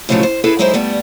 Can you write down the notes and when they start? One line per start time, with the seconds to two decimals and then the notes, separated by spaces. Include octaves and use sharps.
0.09 A2 C#3 F3 F#3 A3 D#4
0.23 C5
0.44 E4 G#4 A4 B4 E5
0.59 F#3 G#3 D#4 E4 G#4 C5
0.74 G3 A3 B3